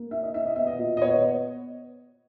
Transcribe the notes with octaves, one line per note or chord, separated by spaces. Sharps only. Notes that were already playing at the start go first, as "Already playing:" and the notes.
Already playing: A#3
E4 E5
D#5
E4 E5
D#5
B3 E5
D#5
A#2
D#5
B3 C#5